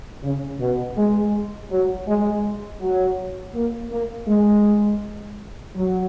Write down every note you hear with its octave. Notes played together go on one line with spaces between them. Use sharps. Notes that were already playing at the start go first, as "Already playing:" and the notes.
C#3
B2
G#3
F#3
G#3
F#3
A#3
A#3
G#3
F#3